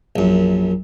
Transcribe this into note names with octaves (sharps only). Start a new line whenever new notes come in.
A#1 F#2